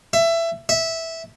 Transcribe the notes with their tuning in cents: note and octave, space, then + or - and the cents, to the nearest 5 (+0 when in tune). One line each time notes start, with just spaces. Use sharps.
E5 +20
E5 -10